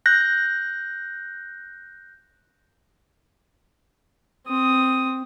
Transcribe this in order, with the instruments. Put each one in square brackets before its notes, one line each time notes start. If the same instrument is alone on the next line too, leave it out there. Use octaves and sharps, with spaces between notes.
[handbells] F#6 G6 A#6
[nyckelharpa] C4 D#6